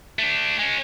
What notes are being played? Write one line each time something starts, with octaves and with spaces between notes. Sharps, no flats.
A3 D4
G#3 C#4